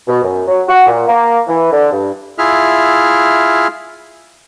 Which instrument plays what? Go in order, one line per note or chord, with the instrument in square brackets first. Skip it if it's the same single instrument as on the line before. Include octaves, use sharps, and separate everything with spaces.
[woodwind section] B2
F#2
F#3
F#4
A#2
A#3
E3
D3
G2
[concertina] E4 F4 G#4 E5 F6